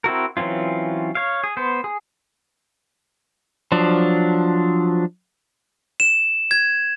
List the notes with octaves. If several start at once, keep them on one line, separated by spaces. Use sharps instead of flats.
C4 E4 F#4 A#4
E3 F#3 C4 C#4 F4
C#5 F5
G#4
B3 C5
G#4
F3 F#3 D4
E7
G#6